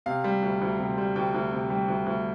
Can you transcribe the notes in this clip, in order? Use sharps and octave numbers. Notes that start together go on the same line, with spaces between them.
C3 F5
G3
D2
D2
C3
G3
D2 G5
D2
C3
G3
D2
D2